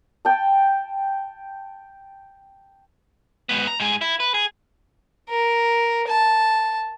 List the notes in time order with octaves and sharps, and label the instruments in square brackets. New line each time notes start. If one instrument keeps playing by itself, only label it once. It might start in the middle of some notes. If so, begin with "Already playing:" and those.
[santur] G5 A5
[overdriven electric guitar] G#2 B3
A#5
G#2 G#4
E4
B4
G#4
[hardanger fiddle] A#4
A5